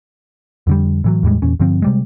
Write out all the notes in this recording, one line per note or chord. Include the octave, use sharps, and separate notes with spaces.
F2 D3 G3
A2 E3 F#3
E2 A2 G3 G#3
E2 A#2 C#4
G2 D3 F3 C4
C3 G3 G#3